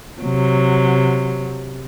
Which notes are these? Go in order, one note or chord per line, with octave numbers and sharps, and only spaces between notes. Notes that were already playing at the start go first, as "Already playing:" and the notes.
C3 F#3